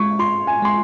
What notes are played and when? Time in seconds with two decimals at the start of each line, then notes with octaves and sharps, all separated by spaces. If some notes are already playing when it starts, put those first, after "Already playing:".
Already playing: G#3 C#6
0.19 F4 C6
0.47 G#5
0.62 G#3 C6